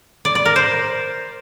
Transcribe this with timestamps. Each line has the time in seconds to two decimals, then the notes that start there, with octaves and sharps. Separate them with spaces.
0.25 D5
0.35 D5
0.46 A#4
0.56 C5